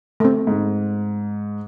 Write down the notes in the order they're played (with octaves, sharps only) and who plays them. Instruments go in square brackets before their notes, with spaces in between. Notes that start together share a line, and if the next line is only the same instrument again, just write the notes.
[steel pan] A3 C4
[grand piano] G#2